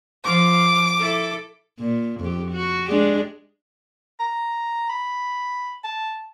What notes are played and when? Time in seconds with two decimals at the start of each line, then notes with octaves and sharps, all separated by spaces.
0.25 F3 D6
0.99 E4 A4
1.79 A#2
2.20 F2 G4
2.51 F#4
2.88 G#3 D4 G4
4.20 A#5
4.89 B5
5.84 A5